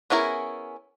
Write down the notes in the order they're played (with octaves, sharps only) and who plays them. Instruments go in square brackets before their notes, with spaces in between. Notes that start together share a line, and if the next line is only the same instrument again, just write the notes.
[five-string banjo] B3 C#4 E4 G#4 A#4